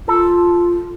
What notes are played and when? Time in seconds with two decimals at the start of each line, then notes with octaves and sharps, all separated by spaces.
0.08 F4 A4